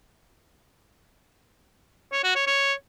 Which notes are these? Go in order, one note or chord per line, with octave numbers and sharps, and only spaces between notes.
C#5
F#4
C#5
C#5